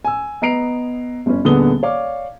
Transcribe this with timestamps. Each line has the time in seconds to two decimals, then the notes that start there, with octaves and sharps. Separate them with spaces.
0.04 G#5 E6
0.42 B3 D#5 A#5 C7 D7 F7
1.26 G1 C#4
1.44 D#1 D3 B3 G#4 D#6 G7
1.83 C#5 D5 F5 D6